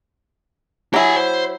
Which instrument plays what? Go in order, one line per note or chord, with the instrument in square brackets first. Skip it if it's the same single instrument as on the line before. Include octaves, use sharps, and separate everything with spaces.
[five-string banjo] F#3 E4 [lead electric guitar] G4 G#5
[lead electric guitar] C5